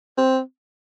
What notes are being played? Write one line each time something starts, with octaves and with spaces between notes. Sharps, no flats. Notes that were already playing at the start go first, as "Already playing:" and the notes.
C4